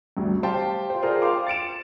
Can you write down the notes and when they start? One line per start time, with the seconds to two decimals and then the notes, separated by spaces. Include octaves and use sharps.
0.17 D2 G2
0.43 G4 C5 F5 G5 A5 C6
0.90 F4 C5
1.03 F4 G#4 A#4 C5 D5
1.22 C5 F5 G5 C6 D6
1.46 A6 C#7 D7 E7